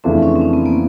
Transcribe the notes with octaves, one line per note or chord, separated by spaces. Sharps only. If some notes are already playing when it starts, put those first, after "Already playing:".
F2 C#3 E3 A3 C4 D4
C#4
C4
C#4
B3
A#3